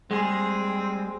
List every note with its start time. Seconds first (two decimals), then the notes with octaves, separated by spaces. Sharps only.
0.11 G3 G#3 C4 G#4